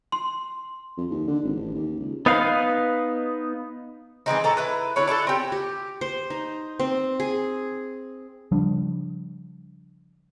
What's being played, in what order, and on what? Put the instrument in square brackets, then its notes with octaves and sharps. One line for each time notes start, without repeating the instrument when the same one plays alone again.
[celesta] C6
[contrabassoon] F2
D#2
D3
G#1
A1
D#2
C#2
[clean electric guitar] B3 D#4 B4 F5
[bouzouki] E3 G#3 C4 D#4
A2 A4 A#5
E4 B4
D3 E4 B4 C#5
D4 E4 F4 A4
C4 G4
[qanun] G4
C5
D#4
C4
G#4
[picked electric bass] C#3 F3 G3 D4